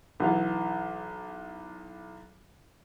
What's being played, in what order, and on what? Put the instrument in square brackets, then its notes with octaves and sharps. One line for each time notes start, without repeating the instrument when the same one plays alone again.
[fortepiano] B1 E3 F5